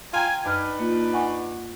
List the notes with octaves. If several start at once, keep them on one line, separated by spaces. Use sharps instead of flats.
F4 G5 G#5 A#5
F#2 D4 D#4 B4 F6
A#3 F4
F#5 G#5 C#6